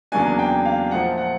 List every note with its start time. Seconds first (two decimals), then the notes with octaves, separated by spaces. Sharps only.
0.12 E2 C#3 F#3 A#3 D4 G#5
0.39 G5
0.65 F5
0.91 A#2 F3 A3 F#5
1.18 F#5